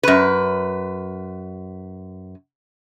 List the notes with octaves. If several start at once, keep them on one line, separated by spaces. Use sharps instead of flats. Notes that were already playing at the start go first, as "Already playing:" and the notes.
F#2 B4